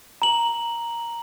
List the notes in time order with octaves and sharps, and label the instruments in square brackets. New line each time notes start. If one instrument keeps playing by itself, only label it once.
[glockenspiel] A#5 F#7